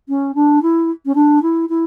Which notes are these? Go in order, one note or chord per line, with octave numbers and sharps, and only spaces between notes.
C#4
D4
E4
C#4
D4
E4
E4